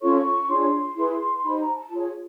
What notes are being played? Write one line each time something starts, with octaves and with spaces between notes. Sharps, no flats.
C#4 F4 A4 C#5 C#6
D4 F4 G#4 C#5 C6
E4 G#4 B4
D#4 G4 C5 B5
A#5
A5
F4 G#4 C#5